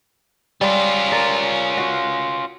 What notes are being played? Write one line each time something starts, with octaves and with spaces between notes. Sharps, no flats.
G3 C#4 F4
A#4 D5
F#4